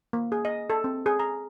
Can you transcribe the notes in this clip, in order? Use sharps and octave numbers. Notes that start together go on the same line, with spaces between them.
A#3
G#4
D#5
A4
C4
G#4
A#5